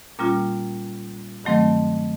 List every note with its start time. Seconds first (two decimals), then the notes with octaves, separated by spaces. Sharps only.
0.19 A#2 G3 A#3 C#4 F4
1.44 G2 D#3 F#3 A3 C4